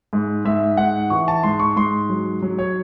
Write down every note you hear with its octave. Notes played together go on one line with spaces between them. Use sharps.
G#2
G#2 E5
G#2 F#5
E3 C#6
A5
G#2 C6
C#6
G#2 C6
F#3
F#3
C#5